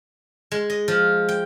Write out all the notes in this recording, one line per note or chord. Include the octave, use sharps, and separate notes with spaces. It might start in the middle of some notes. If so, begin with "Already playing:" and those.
G#3
D#5
F3
G5